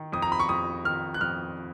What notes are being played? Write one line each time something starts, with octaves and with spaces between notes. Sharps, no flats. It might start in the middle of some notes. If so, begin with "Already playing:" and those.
Already playing: D#3
F2 D#6
A#5
B5
C#6
F2 D#6
D#3 F6
F#6
F2 F6